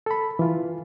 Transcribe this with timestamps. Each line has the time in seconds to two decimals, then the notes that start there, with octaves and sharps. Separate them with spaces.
0.06 A4 B5
0.39 E3 F4